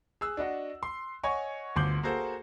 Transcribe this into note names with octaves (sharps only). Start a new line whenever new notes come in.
G#4 E6 F#6
D4 F#4 D#5 F#5
C6
C#5 D#5 F#5 G#5 C#6
G1 D2 C6 D6 G6 F#7
A#3 F#4 G#4 A4 C5